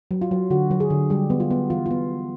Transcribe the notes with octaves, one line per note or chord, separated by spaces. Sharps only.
F#3
F4
F#3
D3 F#4
F#3
G#4
D3
G3 G4
B3
F4
B3
E3 F4
B3 F4